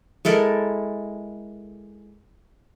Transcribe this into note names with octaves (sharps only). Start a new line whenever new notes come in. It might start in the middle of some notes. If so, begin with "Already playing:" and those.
G#3 E4 A4 A#4